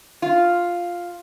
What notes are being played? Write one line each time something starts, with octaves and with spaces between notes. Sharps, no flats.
F4